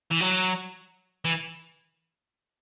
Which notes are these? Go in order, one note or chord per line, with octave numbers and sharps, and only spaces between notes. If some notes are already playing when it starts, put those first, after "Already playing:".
E3
F#3
E3